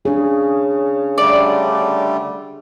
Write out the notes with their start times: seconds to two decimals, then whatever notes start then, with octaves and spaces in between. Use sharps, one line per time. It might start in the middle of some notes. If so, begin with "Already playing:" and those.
0.05 C#3 D4 G#4
1.18 D3 G3 A3 D5